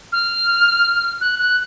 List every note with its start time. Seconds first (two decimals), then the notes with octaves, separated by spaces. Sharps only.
0.12 F6
1.21 F#6
1.39 F#6